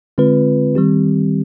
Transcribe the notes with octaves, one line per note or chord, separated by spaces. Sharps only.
D3 G#3 C4 F4 B4
D#3 G3 C4 G4